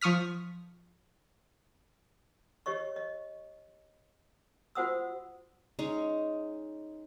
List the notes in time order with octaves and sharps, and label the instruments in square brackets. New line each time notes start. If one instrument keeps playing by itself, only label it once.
[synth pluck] F3 C#6 D#6 F6 B6
[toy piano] G4 C#5 D#5 C#6
D#5
F4 F#4 C5 F#5 D#6 E6
[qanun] G#3 C#4 D#4